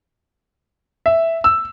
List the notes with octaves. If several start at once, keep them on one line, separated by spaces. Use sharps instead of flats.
E5
E6